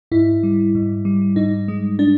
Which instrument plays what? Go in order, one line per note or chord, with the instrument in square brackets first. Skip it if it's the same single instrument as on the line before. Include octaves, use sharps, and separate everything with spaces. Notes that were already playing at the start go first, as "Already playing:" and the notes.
[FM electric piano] G#2 E4
G3
G#2
G3
G#2 D#4
G#3
D4